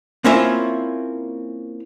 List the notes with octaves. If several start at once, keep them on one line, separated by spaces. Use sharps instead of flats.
A#3 C4 C#4 E4 F4 E5